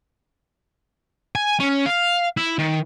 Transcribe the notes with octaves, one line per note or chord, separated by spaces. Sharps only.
G#5
C#4
F5
E4
D#3